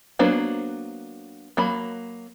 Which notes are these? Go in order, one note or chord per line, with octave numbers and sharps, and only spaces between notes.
F#3 A#3 B3 D4 C5
F#3 A#3 B5